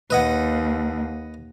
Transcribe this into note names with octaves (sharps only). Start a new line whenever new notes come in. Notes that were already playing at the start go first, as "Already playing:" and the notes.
D#2 B4 D#5 F#5